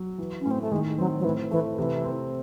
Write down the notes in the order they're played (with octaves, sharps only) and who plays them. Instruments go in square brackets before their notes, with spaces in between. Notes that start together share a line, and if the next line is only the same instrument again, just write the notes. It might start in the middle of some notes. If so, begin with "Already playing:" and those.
Already playing: [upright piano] F#3
E3
[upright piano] A2 [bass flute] C#4
[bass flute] C4
A3
[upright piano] D#3 [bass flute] G#3
[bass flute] F#3 [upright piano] C4
[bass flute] F#3
[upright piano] A2 [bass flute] E3
[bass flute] E3 [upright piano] A3
[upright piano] C3 [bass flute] E3
[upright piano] C4